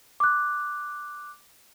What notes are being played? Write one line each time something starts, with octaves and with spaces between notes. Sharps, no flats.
D6 F#6